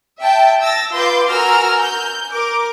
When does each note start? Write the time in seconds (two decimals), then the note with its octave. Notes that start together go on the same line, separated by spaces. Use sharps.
0.21 E5 G5 A5
0.62 E6 A6 A#6
0.92 F4 B4 C6 D6 G6
1.30 F#4 A#4 G#5 A#5 E6 F6
1.80 G6
2.31 A#4 D6